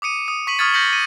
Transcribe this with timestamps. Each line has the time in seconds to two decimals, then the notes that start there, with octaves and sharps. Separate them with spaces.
0.02 D6 D#6 C#7 D#7
0.28 D#6
0.47 C#6 B6 D#7 F#7
0.58 C#6 D#6 F6 G#6 A6 C#7
0.74 G6 A#6 B6 C#7 F#7
0.93 D#7